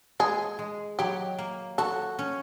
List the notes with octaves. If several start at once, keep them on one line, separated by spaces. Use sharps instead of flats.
G#3 G#4
G#3
F#3 G4
A#3
F#4 A4
C#4